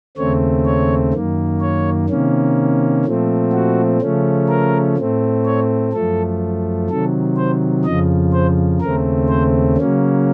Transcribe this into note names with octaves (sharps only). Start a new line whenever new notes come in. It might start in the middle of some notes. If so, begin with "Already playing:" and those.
D#2 C#3 A3 C4 C#5
C#5
F#2 D#3 A#3
C#5
C3 D#3 A#3 C#4
A#2 F3 A3 C4
F#4
C#3 F3 A3 C#4
A#4
A2 A3 C4
C#5
F#2 F3 A3 A4
C3 D#3 F#3 A4
C5
F2 C#3 F3 D#5
C5
D#2 C#3 A3 C4 A#4
C5
C#3 F#3 A#3 C#4